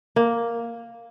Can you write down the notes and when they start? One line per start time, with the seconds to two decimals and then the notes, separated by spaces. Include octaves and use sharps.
0.16 A#3